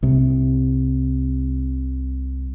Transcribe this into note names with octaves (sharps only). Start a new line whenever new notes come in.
C2 C3